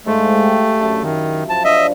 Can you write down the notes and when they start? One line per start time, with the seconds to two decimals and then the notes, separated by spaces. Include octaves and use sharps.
0.06 G#2 G#3 A3 F5
0.33 G4
0.81 F#2 E4 A5
1.03 D#3
1.50 F3 A5
1.65 D4 D#5 E5